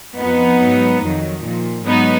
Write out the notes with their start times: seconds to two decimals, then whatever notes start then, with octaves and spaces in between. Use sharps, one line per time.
0.17 F2 F3 B3 D#4
0.60 G#2 F#3
1.02 F2 D#3 F#3
1.45 A#2 F3
1.86 G#2 F#3 B3 D#4